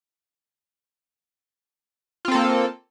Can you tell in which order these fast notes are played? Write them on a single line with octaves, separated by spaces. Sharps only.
F4 C4 A4 A#3